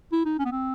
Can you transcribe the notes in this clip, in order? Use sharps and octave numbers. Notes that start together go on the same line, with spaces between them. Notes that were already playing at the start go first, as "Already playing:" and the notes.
E4
D#4
C#4
B3
C4